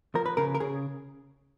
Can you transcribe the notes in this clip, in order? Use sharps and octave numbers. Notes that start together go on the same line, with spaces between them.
F3 A#4
B4
C#3 A#4
A#4
C#3 G#4